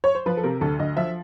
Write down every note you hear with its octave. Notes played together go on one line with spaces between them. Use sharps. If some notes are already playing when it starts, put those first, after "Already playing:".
C#5
C5
F3 B4
A4
C3 A#4
D2 A4
D2 D#5
F3 E5